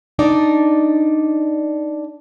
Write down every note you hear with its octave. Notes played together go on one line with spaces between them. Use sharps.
D4 D#4 D5